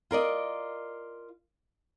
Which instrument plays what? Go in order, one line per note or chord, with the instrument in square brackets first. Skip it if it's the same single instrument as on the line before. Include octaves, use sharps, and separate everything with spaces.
[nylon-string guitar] F4 A#4 D5 D#5